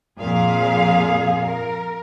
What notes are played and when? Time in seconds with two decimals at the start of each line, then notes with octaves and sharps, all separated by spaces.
0.20 F2 A#2 F3 G#4 F5
1.46 A#4